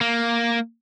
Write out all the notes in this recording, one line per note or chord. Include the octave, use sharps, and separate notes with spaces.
A#3